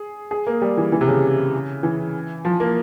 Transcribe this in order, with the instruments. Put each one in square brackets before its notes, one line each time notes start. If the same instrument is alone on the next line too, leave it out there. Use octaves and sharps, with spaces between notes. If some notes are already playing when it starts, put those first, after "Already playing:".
Already playing: [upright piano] G#4
G#4
A#3
G3
E3
E3
C3
C#3
E3
F3
A#3